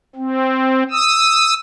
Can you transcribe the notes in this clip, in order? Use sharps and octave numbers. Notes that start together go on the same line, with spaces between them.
C4
D#6 E6